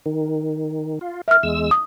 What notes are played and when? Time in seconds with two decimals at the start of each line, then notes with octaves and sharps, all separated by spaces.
0.06 D#3
1.01 F4
1.28 A#4 E5 F6
1.43 E2 G#3 E6
1.71 D#6